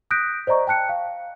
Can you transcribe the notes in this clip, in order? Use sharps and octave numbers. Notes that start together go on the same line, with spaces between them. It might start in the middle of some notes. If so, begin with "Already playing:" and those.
D#6 F#6 G6 A#6 B6 D7
C5 D5 D#5 A#5 C#6
G5 A5 F#6 C#7
F5